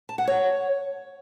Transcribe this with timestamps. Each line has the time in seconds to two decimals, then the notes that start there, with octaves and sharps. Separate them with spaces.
0.09 A5
0.18 F#5
0.27 C#5